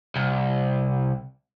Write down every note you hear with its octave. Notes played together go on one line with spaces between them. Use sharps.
C2